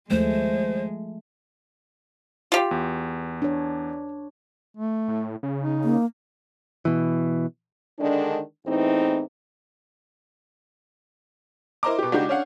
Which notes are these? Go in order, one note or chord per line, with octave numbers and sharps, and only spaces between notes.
D#2 F3 G#3 A3 E4 C5
F4 G4
E2
D4 C#5
A3
A2
C#3
D#4
A#3
B2 E3
D3 D#3 G#3 D4
E2 A2 E3 C4 D#4
E4 A#4 C5 D#5 A#5 D6
B2 G4
C#2 D4 D#4 F#4 G4 G6
C#4 D4 F5 F#5